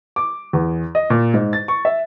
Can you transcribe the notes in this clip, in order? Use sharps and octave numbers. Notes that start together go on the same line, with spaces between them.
D6
E2
D#5
A#2
G#2
A6
C#6
E5